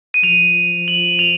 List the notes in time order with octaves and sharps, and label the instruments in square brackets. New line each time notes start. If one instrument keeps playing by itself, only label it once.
[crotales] D#7
[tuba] F3 [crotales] F7
[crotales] F#7
F7